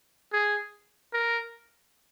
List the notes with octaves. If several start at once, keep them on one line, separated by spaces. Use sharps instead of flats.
G#4
A#4